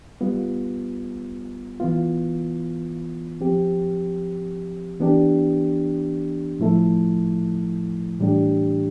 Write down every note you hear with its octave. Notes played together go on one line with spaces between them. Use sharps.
G3 B3 F4
E3 B3 F4
F3 C4 G4
E3 B3 D4 G4
A2 F3 A3 E4 A4
A2 E3 G3 D4 G4